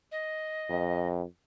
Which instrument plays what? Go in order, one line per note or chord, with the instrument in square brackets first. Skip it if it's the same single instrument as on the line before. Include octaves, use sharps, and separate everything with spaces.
[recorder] D#5
[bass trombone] F2